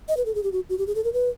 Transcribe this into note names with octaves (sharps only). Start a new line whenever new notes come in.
D#5
B4
A4
G#4
G4
F#4
F#4
G4
G#4
A4
A#4
B4